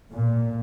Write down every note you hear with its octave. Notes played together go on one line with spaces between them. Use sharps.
A#2